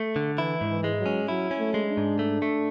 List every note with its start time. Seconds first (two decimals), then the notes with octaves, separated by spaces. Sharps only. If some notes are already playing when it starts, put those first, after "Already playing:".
Already playing: A3
0.16 D3
0.38 E3 E4
0.61 G#2
0.69 E3
0.84 G#3
0.99 F#3
1.06 C#4
1.28 F#3 E4
1.51 C#4
1.59 A3
1.74 G#3
1.89 D4
1.97 G#2
2.19 A3
2.42 A3